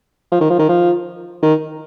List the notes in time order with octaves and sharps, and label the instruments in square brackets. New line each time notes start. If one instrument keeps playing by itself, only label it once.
[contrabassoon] F3
D#3
F3
D#3
F3
D#3